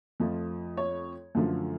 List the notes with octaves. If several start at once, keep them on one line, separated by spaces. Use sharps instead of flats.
F2 F3 A3
C#5
F#2 D3 F3 A3